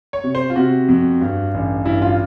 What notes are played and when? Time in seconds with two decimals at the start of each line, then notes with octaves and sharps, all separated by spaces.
0.13 C#5
0.24 C3
0.35 C5
0.50 F4
0.56 C3 F#4
0.89 F2
1.21 G2
1.54 A1
1.86 G2 E4
2.02 F4